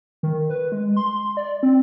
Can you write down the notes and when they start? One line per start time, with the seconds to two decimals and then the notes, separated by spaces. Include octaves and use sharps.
0.23 D#3
0.49 B4
0.72 G#3
0.97 C6
1.37 D5
1.63 C4